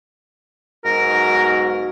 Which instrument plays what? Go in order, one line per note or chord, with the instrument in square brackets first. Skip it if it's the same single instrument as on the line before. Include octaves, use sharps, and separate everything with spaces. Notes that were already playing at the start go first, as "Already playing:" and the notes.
[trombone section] B1 G#2 F#4 [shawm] A#4